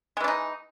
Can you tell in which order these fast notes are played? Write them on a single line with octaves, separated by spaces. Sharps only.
G#3 E3 D4 D#4